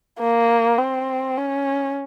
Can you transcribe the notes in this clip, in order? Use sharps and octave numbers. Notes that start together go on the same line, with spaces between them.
A#3
C4
C#4